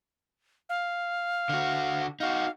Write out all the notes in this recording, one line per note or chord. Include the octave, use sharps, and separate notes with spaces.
F5
D3 F#4
D#4 F#4 F5